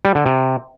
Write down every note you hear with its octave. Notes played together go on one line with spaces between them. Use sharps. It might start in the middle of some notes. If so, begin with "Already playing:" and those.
G3
D3
C3